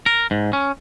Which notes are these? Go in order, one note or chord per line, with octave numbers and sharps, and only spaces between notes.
A#4
G#2
C#4